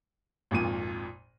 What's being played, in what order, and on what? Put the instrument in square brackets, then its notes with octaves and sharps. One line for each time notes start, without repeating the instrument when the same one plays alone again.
[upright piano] G#1 F2 A#2 D#7